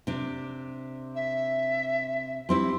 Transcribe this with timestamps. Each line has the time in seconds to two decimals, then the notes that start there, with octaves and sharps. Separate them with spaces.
0.07 C3 D4
1.15 E5
2.49 G3 C4 E4 C6